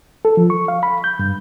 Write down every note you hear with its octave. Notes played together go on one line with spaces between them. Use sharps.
A4
F3
C#6
F5
B5
G6
G2